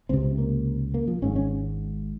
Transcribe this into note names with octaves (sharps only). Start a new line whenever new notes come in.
C#2 C3 C4
A#3
A#3
F3
G#1 G#2 C#4
C#4